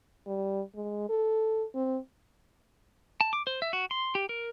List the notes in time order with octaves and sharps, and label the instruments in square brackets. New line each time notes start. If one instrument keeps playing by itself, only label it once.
[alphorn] G3
G#3
A4
C4
[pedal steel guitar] A5
D6
C5
E5
F#4
C6
G4
A#4